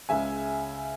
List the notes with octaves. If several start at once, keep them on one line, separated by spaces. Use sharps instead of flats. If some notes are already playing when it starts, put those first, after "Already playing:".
C#2 C#3 G#3 E5 G#5